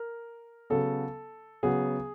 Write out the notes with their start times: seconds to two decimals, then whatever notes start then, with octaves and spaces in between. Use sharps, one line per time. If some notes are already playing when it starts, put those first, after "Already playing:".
Already playing: A#4
0.70 C#3 F#3 B3 A4
1.63 C#3 F#3 B3 G#4